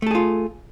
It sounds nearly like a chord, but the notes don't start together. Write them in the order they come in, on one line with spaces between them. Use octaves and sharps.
A3 A4 G#4 F4